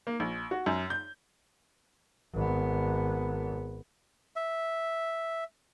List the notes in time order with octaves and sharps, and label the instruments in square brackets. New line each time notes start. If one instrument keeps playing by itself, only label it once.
[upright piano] A#3
A#1
F#4
F#2
G6
[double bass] G#1 B3
[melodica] E5